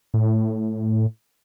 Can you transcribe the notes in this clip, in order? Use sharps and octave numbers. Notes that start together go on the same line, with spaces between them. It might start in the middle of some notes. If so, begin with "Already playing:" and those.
A2